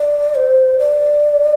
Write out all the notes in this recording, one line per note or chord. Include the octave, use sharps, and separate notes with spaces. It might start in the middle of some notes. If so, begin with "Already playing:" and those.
Already playing: D5
C5
D5